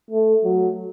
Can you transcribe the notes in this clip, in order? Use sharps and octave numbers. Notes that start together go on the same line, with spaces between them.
A3
F#3